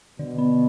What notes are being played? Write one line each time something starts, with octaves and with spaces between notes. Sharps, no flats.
B2 D3
B3